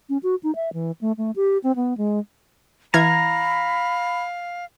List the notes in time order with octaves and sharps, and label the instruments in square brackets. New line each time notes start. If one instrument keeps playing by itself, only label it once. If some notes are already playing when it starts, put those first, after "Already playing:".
[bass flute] C#4
F#4
D#4
E5
E3
A3
A3
G4
C4
B3
G#3
[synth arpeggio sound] E3 F6 G#6 [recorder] F5 [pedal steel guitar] A#5 [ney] B5